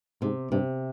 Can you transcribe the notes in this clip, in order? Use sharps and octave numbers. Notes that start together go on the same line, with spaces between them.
G#2 C3
G2 C3